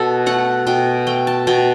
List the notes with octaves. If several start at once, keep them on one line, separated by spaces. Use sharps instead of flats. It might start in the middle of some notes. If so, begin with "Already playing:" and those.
Already playing: B2 A4
A3 F#5
B2 G5
A3 G5
A5
B2 G5